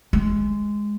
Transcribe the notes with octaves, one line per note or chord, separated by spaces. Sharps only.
G#3